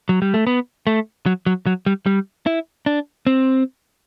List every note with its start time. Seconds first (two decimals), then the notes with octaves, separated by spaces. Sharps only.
0.09 F#3
0.22 G3
0.34 A3
0.47 B3
0.87 A3
1.26 F#3
1.46 F#3
1.66 F#3
1.86 G3
2.06 G3
2.46 E4
2.86 D4
3.27 C4